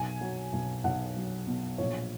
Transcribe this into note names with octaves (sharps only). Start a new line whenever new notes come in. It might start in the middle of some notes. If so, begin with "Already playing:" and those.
Already playing: B1 G#5
F#3
B1
B1 F#5
F#3
B2
A#1 C#5